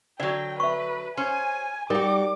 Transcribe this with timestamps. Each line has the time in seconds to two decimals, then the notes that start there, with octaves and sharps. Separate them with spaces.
0.20 D3 F#3 D5 G5
0.60 B4 E5 C#6
1.17 C#4 C5 G#5
1.90 G3 D#4 F#4 A#4 D6